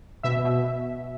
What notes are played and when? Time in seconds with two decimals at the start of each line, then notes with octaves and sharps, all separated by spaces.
0.23 B2 E5
0.44 B2